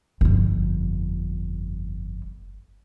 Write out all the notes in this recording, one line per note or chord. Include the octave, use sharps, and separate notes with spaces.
G1 F2